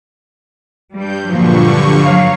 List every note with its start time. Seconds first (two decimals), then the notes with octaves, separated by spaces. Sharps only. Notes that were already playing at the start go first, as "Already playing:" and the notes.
0.95 G2 G3 G6
1.27 G2 A#2 D3 F3 F#3 C#6
2.02 F#3 C#5 F5